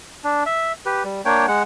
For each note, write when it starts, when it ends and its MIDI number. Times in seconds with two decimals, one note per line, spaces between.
0.24 0.43 62
0.46 0.72 76
0.86 1.03 67
0.86 1.03 71
1.04 1.21 55
1.25 1.46 58
1.25 1.46 62
1.25 1.46 73
1.25 1.46 79
1.48 1.63 56
1.48 1.63 78